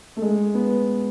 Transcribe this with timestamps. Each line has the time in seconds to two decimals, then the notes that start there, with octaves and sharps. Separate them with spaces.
0.17 A3
0.22 G#3
0.54 B3